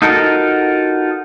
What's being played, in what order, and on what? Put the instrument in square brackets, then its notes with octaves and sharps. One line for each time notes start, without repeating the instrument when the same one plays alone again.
[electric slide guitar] D#4 F4 F#4 A4 A#4